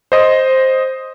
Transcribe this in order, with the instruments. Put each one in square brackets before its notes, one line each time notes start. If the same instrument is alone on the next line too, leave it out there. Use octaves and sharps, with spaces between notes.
[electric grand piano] C5 D#5 C6